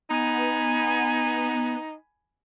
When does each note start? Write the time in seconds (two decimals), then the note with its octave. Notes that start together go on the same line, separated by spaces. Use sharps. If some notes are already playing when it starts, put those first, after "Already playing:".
0.10 B3 D#4 G#5 B5